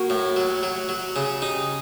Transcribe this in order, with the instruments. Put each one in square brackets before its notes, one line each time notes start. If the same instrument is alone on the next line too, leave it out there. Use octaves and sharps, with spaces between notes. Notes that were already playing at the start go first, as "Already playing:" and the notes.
Already playing: [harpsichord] A#3 [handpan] F#4
[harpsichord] A2
F#3
F#3
F#3
C#3
[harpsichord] D#4 [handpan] G4